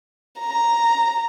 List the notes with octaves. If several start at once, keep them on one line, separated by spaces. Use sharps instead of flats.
A#5